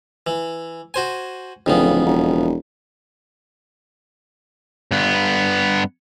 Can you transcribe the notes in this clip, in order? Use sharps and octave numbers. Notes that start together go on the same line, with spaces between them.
E3
F#4 C5 G#5
D1 F2 C#3 B3
E1
G2 B3